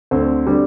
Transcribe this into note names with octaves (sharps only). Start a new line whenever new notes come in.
D2 C4
D3 G3